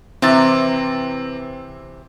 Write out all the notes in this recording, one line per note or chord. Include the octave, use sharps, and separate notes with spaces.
C3 E3 C4 A6